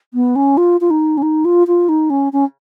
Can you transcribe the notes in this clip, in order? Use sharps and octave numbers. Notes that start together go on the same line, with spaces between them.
B3
C#4
F4
F4
D#4
C#4
D#4
F4
F4
D#4
C#4
C#4